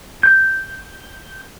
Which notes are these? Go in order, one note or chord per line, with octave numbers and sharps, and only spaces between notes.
G6